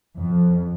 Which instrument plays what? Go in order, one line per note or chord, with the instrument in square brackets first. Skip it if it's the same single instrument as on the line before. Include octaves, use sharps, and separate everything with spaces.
[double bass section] F2